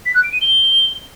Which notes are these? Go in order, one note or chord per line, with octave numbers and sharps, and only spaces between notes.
B6
F#6
D7
D#7
G7